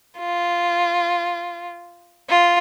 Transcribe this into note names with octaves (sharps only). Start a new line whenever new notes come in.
F4
F4